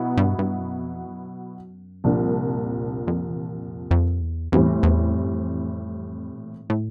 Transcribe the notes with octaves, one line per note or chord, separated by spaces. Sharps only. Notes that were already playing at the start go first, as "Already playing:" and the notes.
Already playing: B2 F#3 B3 E4
G2
G2
F#2
F2
G2
F#2
C2 A#2 F3 A#3 D4
E2
F2
F2
E2
F2
F2
E2
E2 A2 E3 G3 C4
E2
F2
F#2
F2
B2
A#2
G#2
A2